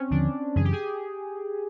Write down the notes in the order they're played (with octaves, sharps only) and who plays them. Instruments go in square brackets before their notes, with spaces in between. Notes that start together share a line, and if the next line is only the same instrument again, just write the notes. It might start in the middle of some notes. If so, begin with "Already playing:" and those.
Already playing: [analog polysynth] C4 C#4
[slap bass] D#2 D3 F3 [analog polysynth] D4
[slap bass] F#2 C#3 E3 [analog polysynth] G#4
[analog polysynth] G4
G#4